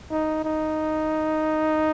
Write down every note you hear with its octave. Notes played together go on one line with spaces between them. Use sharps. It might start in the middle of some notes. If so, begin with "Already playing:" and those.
D#4
D#4